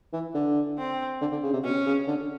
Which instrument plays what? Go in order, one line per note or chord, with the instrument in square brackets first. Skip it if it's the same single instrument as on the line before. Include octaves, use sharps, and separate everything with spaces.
[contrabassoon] E3
D3
[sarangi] C4
[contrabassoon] D3
D3
C#3
C3
[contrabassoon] B2 [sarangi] C#4
[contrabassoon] C#3
D3